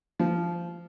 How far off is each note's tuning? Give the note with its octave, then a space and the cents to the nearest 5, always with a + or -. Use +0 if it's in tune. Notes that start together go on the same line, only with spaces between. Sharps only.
F3 -15